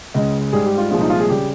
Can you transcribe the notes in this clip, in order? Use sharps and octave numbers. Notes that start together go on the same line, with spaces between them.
C#2 C#3 G#3 D#5
G#2 G3 G#4
G4
F4
C2 A#2 F3 G#3 F4
D#4
F4
G#4
C#3 G3 G4